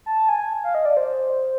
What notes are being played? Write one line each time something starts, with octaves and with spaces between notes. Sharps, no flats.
A5
G#5
F5
D#5
D5
C5